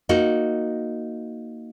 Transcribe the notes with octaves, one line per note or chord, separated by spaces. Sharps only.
A#3 D#4 F#4